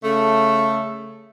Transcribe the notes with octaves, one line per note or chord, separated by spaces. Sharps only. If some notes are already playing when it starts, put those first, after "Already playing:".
C#3 A3